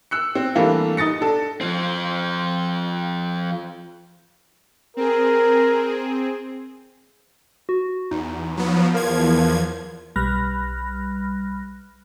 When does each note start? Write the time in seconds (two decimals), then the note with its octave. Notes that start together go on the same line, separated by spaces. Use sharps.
0.11 E6 F#6 C#7
0.35 C4
0.55 E3 G3 A3 A#3 D4 F4
0.97 D#4 D#6 A6 A#6 C#7
1.21 D4 A4
1.61 F3 C4
4.97 C4 G#4 A#4
7.69 F#4
8.11 E2 D#4
8.57 F3 F#3 B3
8.94 E2 F3 A#4 G#6
10.16 B1 G3 B5 F6 F#6 A#6